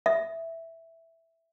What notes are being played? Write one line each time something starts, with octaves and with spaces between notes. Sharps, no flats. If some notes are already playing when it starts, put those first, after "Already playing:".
E5